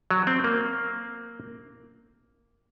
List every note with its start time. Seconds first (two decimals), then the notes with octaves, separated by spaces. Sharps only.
0.11 F#3
0.27 C4
0.44 A#3